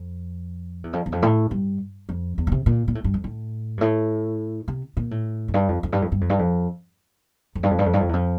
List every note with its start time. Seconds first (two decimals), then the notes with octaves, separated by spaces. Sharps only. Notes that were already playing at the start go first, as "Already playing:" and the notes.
Already playing: F2
0.84 E2
0.93 F2
1.06 E2
1.12 F2
1.22 A2
1.51 G2
2.09 F2
2.38 E2
2.47 A#2
2.52 C3
2.66 A#2
2.88 A#2
2.95 A2
3.04 G2
3.14 F2
3.24 A2
3.78 G2
3.81 A2
4.68 C3
4.97 A#2
5.11 A2
5.48 F2
5.54 G2
5.68 F2
5.83 F2
5.92 G2
6.02 F2
6.12 G2
6.21 F2
6.30 G2
6.39 F2
7.55 F2
7.63 G2
7.71 F2
7.79 G2
7.86 F2
7.94 G2
8.00 F2
8.09 E2
8.13 F2